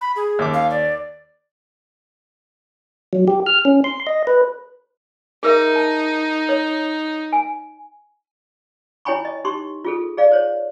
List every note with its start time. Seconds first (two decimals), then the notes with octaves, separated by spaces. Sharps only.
0.01 B5
0.16 G#4
0.39 D#2 D6
0.53 F5
0.70 D5
3.13 F#3
3.28 G4
3.46 F6
3.65 C#4
3.84 C6
4.07 D#5
4.27 B4
5.43 D#4 G#4 A#4 E5
5.76 A5
6.49 C#5
7.32 G#5
9.05 E4 C#5 G5 G#5 B5 C#6
9.25 D#5
9.44 D#4 G4 C6 C#6
9.85 F4 G#4 A4
10.17 G#4 D5 F5
10.32 C5 C#5